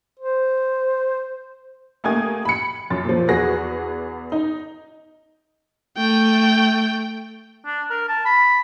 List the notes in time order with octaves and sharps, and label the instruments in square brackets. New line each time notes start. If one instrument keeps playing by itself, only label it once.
[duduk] C5
[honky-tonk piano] A3 A#3 G4 G#5 D#6 G#6
B5 C#7
F#2 A6
A#2 F3
E2 B3 F#4 G#4 A#6
D#4
[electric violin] A3 G5
[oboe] D4
A#4
A5
B5